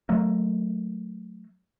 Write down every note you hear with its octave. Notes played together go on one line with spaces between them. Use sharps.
F#3 A3 A#3